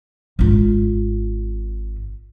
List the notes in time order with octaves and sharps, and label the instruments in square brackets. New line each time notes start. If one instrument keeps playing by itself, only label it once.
[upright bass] G#1 F4